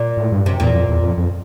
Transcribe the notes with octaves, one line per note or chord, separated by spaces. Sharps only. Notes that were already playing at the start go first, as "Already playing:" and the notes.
Already playing: A#2
A2
G2
F#2 C3
E2 A#2
F2
E2
F2
F2